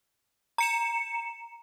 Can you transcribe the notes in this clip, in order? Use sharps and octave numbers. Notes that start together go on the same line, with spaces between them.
A#5 C#7 E7